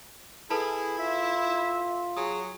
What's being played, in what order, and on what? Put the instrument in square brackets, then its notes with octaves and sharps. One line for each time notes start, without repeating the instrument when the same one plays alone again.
[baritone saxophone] E4 [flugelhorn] G#4 [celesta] A4 B4 A5
[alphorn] F4 [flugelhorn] E5
[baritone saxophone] F#3 [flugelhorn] G#4 [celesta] D#6